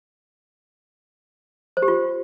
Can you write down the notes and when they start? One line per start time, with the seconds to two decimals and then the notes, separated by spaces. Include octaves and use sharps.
1.77 C5
1.82 G4
1.88 F4